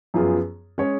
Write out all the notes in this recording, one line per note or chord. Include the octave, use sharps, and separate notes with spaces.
F#2 F3 B3 F4 G#4
G#3 C#4 G#4 C#5